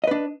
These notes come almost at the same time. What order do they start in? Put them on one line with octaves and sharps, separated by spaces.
D#5 B4 D4